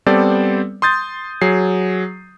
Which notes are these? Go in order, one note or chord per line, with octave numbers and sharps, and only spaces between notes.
G3 B3 C4 A4 C5 D5
C6 D#6 G6 A6
F#3 G#4 C7